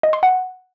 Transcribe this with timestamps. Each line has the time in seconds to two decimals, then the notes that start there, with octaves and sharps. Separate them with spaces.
0.03 D#5
0.13 C6
0.23 F#5